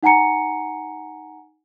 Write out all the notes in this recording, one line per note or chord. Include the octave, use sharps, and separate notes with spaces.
D#4 F#5 G#5 A#5 C#7